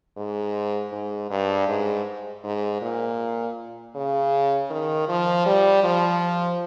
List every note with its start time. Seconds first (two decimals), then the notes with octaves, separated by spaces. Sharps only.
0.17 G#2
0.93 G#2
1.31 G2
1.68 G#2
2.44 G#2
2.82 A#2
3.95 C#3
4.70 D#3
5.09 F3
5.46 G3
5.84 F3